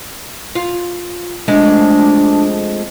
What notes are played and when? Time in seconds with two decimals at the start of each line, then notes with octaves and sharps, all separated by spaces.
0.55 F4
1.48 F2 G#3 A3 D4